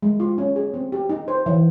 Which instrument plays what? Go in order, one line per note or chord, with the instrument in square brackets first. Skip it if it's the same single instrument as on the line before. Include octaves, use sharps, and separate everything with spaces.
[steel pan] G#3
F4
C#4
G#4
C4
G4
D#4
C5
E3